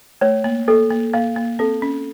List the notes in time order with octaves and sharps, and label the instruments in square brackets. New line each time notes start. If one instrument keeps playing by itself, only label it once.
[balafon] A3 [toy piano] C#5
[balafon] A#3
[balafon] A#3 [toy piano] A4
[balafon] A#3
[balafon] A#3 [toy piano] F5
[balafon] A#3
[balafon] C4 [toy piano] A4
[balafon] C#4